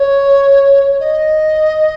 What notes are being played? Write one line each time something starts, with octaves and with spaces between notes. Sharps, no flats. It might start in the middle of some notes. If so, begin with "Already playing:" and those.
Already playing: C#5
D#5